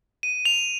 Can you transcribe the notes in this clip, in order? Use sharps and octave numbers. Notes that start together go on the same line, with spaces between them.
D#7
F7